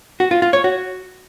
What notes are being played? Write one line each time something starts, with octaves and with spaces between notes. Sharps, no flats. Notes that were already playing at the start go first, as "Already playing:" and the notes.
F#4
F4
F4
C#5
F#4